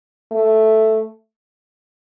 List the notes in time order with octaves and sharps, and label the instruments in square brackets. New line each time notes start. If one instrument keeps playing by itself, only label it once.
[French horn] A3